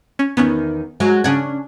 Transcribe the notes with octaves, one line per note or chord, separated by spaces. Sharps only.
C#4
E2 D#3 B3 C#4
F#3 G#3
C#3 C#4 D4 F#5 G#6